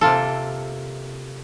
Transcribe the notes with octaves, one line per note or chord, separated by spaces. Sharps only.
C3 A#3 F4 A4